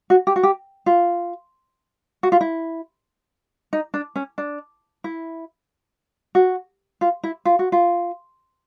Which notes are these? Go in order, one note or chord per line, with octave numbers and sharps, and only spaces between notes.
F#4
G4
F#4
G4
F4
F#4
F4
E4
D#4
D4
C#4
D4
E4
F#4
F4
E4
F4
F#4
F4